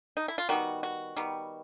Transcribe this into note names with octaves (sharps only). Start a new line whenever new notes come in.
D#4
E4
F4
D#3 G3 B3 F#4
F#4
D#3 G3 B3